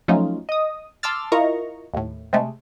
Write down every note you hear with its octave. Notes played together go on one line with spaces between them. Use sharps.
F3 F#3 A3 C#4 D#4 F4
D#5 D#6
A5 C6 D6 E6 F6 A6
E4 F4 A#4 D#5 A#5 C#6
D#2 A2
C3 G#3 A3